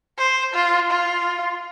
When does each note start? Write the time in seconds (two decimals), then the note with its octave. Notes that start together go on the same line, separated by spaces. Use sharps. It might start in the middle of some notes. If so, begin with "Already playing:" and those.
0.18 C5
0.54 F4
0.90 F4